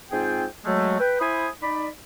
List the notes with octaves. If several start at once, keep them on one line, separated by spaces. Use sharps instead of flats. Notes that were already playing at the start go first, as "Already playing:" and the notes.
G#2 C4 F4 G#4 G5
F#3 G#3 A3
B4 G5
E4 C5 G#5 B5 D#6
D#4 D5 B5